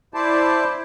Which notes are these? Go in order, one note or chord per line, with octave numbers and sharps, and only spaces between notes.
E4 C5 D5 A5